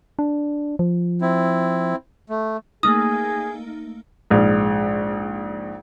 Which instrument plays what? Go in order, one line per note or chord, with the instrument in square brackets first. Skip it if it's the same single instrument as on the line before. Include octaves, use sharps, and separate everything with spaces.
[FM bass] D4
F3
[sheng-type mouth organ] C4 E4
A3
[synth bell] A3 A#3 D#4 [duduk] G#4 [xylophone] D#6
[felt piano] A#1 G#2